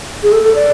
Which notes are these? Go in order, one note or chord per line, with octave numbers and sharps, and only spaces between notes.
G#4
A4
A4
D5